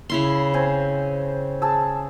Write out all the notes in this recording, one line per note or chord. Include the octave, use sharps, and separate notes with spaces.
C#3 E4 C6
C4 C5 G#5
G#4 A5 E6